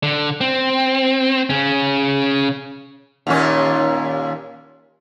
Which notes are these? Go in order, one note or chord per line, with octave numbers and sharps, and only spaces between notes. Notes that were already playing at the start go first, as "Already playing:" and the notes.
D3
C4
C#3 C#4
D#2 A#2 C#4